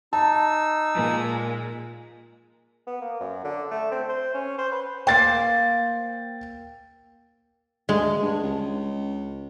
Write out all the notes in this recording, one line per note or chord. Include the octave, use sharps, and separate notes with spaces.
D#4 A5 E6
A#2 G#3 A#3
B3
A#3
F#2
D3
A3
C4
C5
C#4
C5
B4
A#3 C5 G5 A6
D2 G#3
G2
C#2